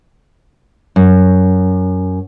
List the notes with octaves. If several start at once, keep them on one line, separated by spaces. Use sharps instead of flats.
F#2